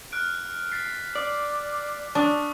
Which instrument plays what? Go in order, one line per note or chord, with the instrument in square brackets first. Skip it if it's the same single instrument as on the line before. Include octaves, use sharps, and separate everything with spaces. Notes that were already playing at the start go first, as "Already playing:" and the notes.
[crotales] F6 F#6 D7
A6 B6 C7
[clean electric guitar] D5
[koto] D4 [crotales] C#6 D#6